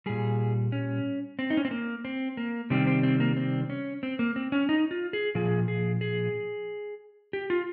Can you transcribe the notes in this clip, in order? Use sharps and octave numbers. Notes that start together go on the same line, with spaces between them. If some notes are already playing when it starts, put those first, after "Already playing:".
A#2 G3 G#4
C#4
C4
D#4
C#4
C4
A#3
C4
A#3
C3 D#3 G3 C4
C4
C4
A#3
C4
C#4
C4
A#3
C4
C#4
D#4
F4
G#4
A#2 F3 G#4
G#4
G#4
G4
F4